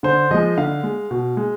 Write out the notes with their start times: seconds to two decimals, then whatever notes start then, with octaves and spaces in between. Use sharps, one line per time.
0.03 D3 C5
0.31 F3 G#3 D#5
0.57 D3 F5
0.83 G#3
1.11 B2
1.37 G#3